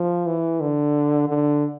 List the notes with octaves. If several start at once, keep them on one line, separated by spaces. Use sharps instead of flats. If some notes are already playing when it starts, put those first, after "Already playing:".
Already playing: F3
E3
D3
D3